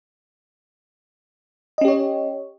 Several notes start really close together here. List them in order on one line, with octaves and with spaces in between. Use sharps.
D#5 C#4 G4 C#5